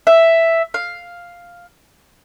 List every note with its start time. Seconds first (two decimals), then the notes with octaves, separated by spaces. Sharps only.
0.07 E5
0.74 F5